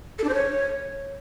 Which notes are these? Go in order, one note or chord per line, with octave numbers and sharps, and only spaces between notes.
A4
D4
C5
C#5